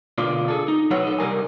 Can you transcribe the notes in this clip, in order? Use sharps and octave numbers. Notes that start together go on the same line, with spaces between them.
B2 D3 F4 D5
G#4 A4
D#4
B1 F#3 A4 B4 C#5 F#5
D#4 A4
C2 G3 A#4 G#5